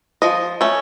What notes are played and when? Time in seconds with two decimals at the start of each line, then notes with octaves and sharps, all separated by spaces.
0.22 F3 D#5
0.61 A3 C#4